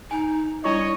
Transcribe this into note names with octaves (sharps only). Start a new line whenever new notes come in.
D#4 G#5
G3 D4 E4 C#5 D#5 C#6